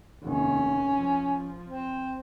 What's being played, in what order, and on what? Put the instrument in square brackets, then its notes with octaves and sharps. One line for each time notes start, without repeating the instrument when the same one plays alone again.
[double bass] F1 D#2 [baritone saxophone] C#4
[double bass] F3
[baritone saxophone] C4